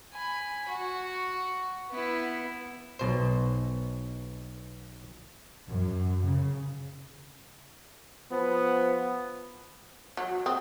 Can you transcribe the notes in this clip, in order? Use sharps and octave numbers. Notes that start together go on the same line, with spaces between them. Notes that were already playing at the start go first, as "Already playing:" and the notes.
G#5 B5
F#4
B3 E4
B1 B2 C5
F#2
C#3
F3 B3
F#3
C4 D#6